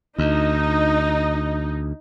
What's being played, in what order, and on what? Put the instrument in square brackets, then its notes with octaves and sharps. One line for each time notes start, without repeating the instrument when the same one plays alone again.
[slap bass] D2 [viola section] D#4